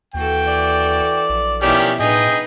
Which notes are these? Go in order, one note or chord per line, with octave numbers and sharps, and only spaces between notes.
D#2 E3 F#4 A4 G5
D5
A#1
B2 D#3 F3 C#4 E4 G4 D5
A2 D#4 G#4 B4 D#5 G5